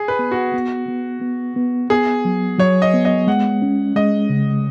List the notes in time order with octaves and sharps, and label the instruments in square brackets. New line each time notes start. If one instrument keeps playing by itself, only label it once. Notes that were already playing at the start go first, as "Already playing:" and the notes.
Already playing: [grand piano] G#4
B4
[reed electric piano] B3
[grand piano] F#4
[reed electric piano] B3
B3
B3
B3
[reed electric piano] B3 [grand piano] G#4
[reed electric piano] F#3
[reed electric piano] F#3 [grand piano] C#5
[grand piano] D#5
[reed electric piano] B3
[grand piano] D#5
[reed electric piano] G#3 [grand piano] F#5
[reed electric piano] C#4
[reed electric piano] G#3 [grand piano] D#5
[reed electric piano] C#3